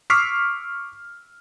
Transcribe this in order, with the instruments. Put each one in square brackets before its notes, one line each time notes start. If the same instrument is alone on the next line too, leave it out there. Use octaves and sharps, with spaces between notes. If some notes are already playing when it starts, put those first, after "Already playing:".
[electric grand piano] C#6 D6 E6 F6 B6 C7